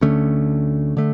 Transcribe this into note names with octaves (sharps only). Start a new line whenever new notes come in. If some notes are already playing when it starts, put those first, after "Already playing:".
D2 D3 A3 C#4
D3 A3